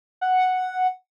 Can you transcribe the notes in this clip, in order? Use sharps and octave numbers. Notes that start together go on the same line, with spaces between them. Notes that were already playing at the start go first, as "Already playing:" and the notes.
F#5